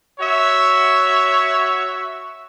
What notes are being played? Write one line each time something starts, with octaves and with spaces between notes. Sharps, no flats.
F#4 C#5 E5